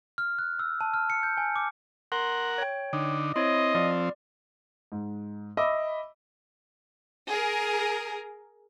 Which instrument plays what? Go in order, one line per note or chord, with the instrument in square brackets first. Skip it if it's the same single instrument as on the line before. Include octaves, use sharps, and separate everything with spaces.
[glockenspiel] F6
F#6
E6
A5
F6
C#7
G6
G#5
D6
[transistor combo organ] A#4 F#5 [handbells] C6
[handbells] C#5 G5
[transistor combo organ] D3 D#4
[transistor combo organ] C4 [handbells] E4 C#5 [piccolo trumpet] D#5
[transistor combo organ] F3 C4 [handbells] D5
[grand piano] G#2
D#5 E5 B5 D6 E6
[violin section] G#4 A#4